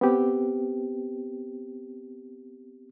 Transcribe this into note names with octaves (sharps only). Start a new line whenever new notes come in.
B3 C4 G4